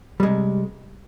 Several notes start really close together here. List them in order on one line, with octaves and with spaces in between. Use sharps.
G3 G#3 C3